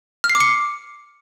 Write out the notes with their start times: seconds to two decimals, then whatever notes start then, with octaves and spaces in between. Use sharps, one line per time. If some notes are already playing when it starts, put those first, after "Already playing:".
0.24 F6
0.29 C7
0.35 D6
0.40 C#7